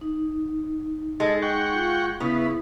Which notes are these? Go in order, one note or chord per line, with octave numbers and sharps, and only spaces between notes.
D#4
G#3 A4
F#5 G5 C#6
F4
C#3 B3 E4